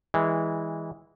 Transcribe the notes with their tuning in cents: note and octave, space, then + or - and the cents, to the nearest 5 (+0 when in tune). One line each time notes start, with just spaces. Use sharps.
E3 -20 G#3 -20